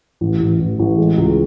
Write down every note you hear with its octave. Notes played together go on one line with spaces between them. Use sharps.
A1
A1
A1
A1
G#3
C#2